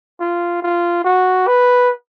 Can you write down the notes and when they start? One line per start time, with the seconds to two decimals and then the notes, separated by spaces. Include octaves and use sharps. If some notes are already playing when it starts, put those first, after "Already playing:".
0.20 F4
0.62 F4
1.05 F#4
1.48 B4